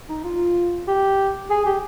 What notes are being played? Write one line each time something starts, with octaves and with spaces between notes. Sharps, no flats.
D#4
F4
G4
G#4
G4